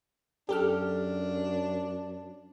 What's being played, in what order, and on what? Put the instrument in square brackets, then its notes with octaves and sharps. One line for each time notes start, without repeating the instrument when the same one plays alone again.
[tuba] F#2 [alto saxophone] D4 [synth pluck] G4 A4 F6